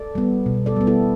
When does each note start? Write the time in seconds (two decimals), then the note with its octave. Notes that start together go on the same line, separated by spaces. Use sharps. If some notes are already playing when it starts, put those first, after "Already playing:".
Already playing: A4 D5
0.15 G3 B3
0.46 B2
0.66 A4 D5
0.77 G3 B3
0.87 E4 A4